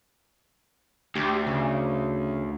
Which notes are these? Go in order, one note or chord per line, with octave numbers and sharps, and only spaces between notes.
D2 G4
C#3